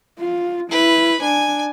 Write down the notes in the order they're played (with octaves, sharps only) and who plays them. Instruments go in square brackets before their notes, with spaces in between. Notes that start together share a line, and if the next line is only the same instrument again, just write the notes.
[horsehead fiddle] F4
[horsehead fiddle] E4 [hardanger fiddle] B4
[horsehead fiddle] D4 [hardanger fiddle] G#5